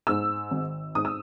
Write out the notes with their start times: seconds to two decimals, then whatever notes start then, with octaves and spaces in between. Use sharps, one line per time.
0.07 G#2 E6
0.51 G#1
0.95 G#2 D#6
1.05 E6